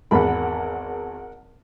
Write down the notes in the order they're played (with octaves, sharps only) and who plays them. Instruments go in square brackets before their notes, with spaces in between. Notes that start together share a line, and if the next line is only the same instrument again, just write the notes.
[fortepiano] G#1 E2 B5 [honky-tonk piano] A#4 F#5